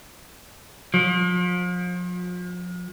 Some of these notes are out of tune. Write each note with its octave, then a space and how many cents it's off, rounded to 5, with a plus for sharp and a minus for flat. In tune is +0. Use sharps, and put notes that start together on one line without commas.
F3 +40